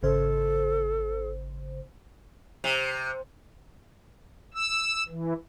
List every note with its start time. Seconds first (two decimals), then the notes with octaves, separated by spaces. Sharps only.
0.03 G#1 C#3 A4 C5
2.64 C3
4.54 E6
5.09 E3